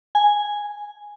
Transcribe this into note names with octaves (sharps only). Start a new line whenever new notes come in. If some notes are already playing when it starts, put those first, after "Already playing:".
G#5